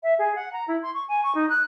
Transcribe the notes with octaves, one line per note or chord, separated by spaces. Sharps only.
E5
G#4
F#5
A#5
E4
C6
C#6
G#5
C#6
D#4
F#6